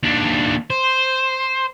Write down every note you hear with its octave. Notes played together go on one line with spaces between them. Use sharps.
D#2 D4
C5